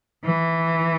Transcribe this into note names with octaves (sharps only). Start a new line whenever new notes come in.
E3